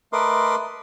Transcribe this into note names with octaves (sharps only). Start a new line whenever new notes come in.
A3 A#4 B4 D#5 C6 D6